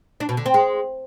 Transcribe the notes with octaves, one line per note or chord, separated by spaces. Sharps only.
D4
B2
D3
C4
G#3